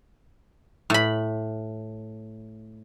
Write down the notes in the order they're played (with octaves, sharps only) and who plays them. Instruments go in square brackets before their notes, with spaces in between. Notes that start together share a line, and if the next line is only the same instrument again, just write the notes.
[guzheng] A2 B5